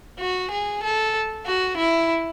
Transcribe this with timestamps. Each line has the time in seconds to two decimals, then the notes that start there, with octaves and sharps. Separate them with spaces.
0.19 F#4
0.51 G#4
0.83 A4
1.46 F#4
1.77 E4